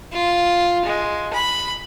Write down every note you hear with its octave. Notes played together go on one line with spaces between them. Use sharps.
F4
G#3
B5